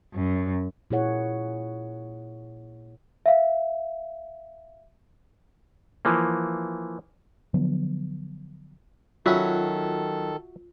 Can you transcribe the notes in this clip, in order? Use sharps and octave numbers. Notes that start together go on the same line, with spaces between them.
F#2
A#2 A#3 E4 G#4 C#5 F#5
E5 F5
E3 F3 A#3
D3 F3 F#3 B3
D#3 F#3 C#4 F4 F#4 A4 E5